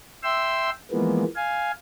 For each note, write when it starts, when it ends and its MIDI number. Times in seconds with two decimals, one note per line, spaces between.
0.23 0.70 76
0.23 0.70 79
0.23 0.70 84
0.23 0.70 88
0.92 1.24 52
0.92 1.24 53
0.92 1.24 56
0.92 1.24 58
0.92 1.24 59
1.36 1.71 77
1.36 1.71 80